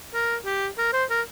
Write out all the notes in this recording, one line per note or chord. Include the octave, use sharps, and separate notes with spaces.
A#4
G4
A#4
C5
A#4